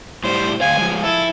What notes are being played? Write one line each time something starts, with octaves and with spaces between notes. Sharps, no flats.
A2 G3 C5
D2 F5 G#5
F3 G#3
E4 A4